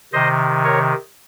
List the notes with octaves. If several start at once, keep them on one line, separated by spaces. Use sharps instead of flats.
C3 D#3 C5 D#5
A#4 C#5